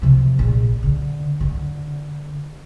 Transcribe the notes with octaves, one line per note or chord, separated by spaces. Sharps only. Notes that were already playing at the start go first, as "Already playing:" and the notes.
C3 F3
A#1
D3
D3